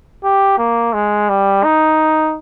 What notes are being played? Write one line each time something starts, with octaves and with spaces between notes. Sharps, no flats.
G4
A#3
G#3
G3
D#4